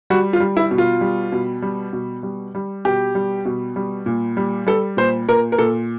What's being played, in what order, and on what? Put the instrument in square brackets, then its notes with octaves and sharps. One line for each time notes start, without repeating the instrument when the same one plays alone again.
[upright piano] G3 F#4
F4
G3
E4
B2
F4
G3
B2
G3
B2
G3
G3
B2 G4
G3
B2
G3
A#2
G3
G3 A4
A#2 C5
A#2 A#4
A#4
A#2 A4